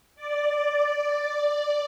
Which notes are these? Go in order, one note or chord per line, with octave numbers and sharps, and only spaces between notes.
D5